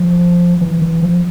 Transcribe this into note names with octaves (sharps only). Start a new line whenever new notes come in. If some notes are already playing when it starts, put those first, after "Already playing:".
Already playing: F3
E3
E3
F3